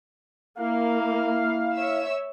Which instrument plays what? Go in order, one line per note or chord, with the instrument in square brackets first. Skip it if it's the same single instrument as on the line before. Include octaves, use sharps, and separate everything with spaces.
[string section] A#3 [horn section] E4 F5
[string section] C#5 E5 E6